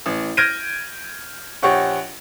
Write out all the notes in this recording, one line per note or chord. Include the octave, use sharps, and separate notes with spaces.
A1
F6 G6 G#6 A#6 D7 D#7
A#1 G4 C#5 F#5 C#6